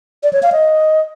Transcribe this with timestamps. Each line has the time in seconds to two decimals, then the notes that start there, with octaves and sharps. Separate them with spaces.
0.23 D5
0.33 C#5
0.43 F5
0.52 D#5